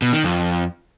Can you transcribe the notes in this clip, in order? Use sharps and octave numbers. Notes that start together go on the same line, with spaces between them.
B2
D#3
F2